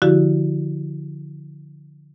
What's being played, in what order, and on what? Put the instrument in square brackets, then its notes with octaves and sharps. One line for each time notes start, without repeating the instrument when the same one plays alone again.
[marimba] D3 F3 E4 F#4 G4